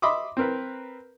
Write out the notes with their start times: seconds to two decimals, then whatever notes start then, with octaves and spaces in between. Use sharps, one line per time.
0.02 D#5 E5 B5 C6 D6 D#6
0.37 C4 A#4 B4